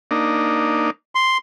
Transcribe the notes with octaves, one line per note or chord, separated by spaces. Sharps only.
A#3 D4 D#4
C6